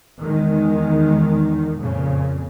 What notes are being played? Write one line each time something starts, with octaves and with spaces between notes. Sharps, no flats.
E2 D#3 G#3
F2 A#2 C#3